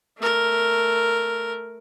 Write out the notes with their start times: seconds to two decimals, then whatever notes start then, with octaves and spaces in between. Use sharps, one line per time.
0.18 A3 A#4